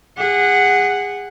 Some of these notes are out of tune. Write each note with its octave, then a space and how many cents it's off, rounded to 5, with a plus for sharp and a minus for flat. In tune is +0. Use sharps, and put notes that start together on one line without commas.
G#4 -30 F#5 +0